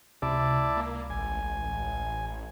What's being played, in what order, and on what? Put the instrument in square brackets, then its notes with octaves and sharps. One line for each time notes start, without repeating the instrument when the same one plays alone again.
[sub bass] C#2 [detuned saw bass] C3 [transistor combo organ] E4 D5 A5
[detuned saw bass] A#3
[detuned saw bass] A1 [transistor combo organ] G#5